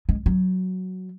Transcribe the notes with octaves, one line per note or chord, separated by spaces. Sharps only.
G#3
F#3